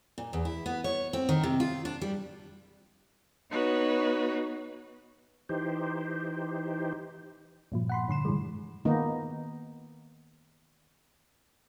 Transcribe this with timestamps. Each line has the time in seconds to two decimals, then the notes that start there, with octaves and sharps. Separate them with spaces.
0.18 A#2
0.33 E2
0.45 E4
0.66 B3
0.84 C#5
1.13 C4
1.29 D#3
1.43 C3
1.60 F4
1.85 D4
2.01 G3
3.50 B3 D#4 F#4 B4 C#5
5.49 E3 D#4 G4 C5
7.72 G2 A#2 F3
7.89 F#5 B5 C6
8.08 G2 D3 C6 E7
8.25 G2 D3 E3 G3 G#3
8.85 D#3 A#3 B3 D#4